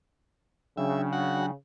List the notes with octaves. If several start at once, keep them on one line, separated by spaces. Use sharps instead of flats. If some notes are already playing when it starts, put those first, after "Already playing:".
C#3 F#3 D4 E5 G5
F#4 F#5